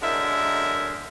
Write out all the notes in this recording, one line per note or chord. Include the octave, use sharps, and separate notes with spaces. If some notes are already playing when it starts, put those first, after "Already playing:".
F#2 D3 G#3 A#4 D#5 E5